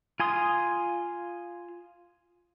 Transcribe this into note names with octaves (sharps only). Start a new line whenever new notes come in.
F4 G#5 C6 D#6